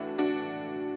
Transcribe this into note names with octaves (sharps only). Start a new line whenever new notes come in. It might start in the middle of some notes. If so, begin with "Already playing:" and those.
Already playing: A2 E3 A3 D4 F#4
D4 F#4